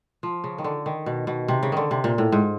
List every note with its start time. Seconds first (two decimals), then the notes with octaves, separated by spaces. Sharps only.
0.23 F3
0.44 C#3
0.58 D#3
0.64 D3
0.86 D#3
1.06 B2
1.27 B2
1.48 C3
1.63 C#3
1.72 D3 D#3
1.91 C3
2.04 A#2
2.18 A2
2.32 G#2